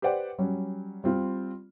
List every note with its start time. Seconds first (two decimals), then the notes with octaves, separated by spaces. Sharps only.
0.02 G4 B4 C5 D5 F#5 G5
0.38 F#3 G3 C#4
1.04 G3 C4 F4